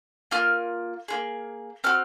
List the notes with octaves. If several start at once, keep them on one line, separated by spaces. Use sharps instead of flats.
A#3 F4 F6
A#3 F4 G#4
C4 F#4 F6